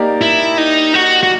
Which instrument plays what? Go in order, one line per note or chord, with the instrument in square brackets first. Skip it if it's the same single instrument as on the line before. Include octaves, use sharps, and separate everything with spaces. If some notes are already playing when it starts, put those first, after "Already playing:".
Already playing: [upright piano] A#3 D#4 G4 A#4 D5
[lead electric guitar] E4
D#4
F#4
F#4